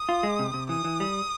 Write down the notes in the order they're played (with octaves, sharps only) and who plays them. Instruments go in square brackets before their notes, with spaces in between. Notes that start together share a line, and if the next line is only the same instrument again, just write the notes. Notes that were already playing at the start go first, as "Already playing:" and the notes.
Already playing: [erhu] D#6
[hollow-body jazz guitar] F4
G#3
C3
C3
[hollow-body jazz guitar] E3 [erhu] D#6
[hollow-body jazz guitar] E3
G3